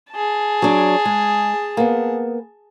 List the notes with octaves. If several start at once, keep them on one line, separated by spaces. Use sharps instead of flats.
G#4 A5
F#3 D4
G#3
A#3 B3